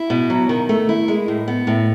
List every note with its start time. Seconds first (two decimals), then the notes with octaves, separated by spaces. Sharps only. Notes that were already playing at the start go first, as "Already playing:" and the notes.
Already playing: E4
0.10 B2
0.30 F#3
0.49 D#3
0.69 A3
0.89 E4
1.08 G#3
1.28 A2
1.48 B3
1.67 A2